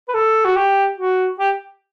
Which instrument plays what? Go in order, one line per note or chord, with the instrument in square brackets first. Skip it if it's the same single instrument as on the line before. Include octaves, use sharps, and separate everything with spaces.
[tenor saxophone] B4
A4
F#4
G4
F#4
G4